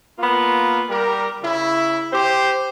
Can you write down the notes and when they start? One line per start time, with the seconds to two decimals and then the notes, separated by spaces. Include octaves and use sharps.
0.19 A#3 B3 F4
0.90 G3 G4 A#4
1.42 C#3 E4
2.13 G4 C5